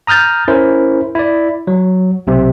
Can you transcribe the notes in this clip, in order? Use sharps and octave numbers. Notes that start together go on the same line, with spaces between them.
A#5 D#6 F6 G6 A6
C#4 E4 A#4 C5
E4 D5
F#3
B1 C3